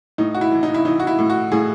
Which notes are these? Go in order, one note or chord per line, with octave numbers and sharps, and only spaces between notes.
A2 D#4
F#4
E4
E3
D#4
E4
E3 D#4
F#4
E4
A2
F#4
A2 G#4